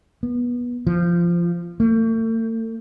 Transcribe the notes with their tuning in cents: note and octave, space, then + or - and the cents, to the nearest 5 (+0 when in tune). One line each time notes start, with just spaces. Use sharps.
B3 -20
F3 -15
A3 +40